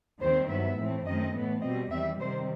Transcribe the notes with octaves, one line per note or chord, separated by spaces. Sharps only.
D#2 D#3 G3 C4 C5
G2 F#3 B3 E5
A2 E3 A3 C4
F#2 D#3 A3 C4 D#5
A2 E3 B3
B2 G3 C4 D#5
E2 D#3 G3 C4 E5
C3 D#3 G3 C4 C5